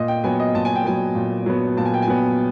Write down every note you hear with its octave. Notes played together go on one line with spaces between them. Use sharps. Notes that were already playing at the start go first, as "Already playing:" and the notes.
Already playing: A#2 D#5
G5
F#3 B3 G#5
D#5
A#2 A5
G#5
G5
F#3 B3 G#5
A#2
F#3 B3
A#2 A5
G#5
G5
G#5
F#3 B3